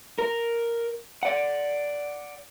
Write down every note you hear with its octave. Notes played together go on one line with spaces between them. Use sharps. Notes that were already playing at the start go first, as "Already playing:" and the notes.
A#4
D5 F#5